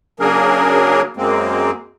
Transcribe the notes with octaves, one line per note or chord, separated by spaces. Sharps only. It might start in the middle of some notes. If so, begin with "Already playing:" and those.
C#3 F#3 A#3 D4 G#4 A#4
F#2 G#3 A#3 C4